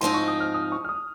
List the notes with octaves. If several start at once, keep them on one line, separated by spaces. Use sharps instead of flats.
G#2 F3 C4 D#4 C6
C#6
D#6
F6
D#6
C#6
F6
D#6